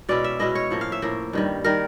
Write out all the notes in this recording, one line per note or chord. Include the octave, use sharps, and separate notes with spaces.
B2 G#3 C#4 E4 D5
E5
B2 G#3 C#4 E4 D#5
C#5
A2 F3 A#3
F5
E5
A2 F3 A#3
G2 D#3 G3
D#3 G3 A#4